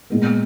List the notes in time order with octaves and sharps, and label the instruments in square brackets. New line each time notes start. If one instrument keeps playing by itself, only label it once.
[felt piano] A#2 G#3 B3